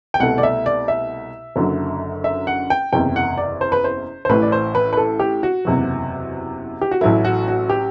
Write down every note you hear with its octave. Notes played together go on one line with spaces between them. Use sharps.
G5
C2 B2 A3 F#5
D5
E5
D5
E5
F#1 F#2 D3 F#3
E5
F#5
G5
F#1 E2 C3 G5
F#5
D5
C5
B4
C5
C5
A1 A2 E3 B4
D5
C5
B4
B4
A4
G4
F#4
F#1 E2 C3 F#3
G4
F#4
A1 A2 F#3 A3 E4
F#4
F#4
G4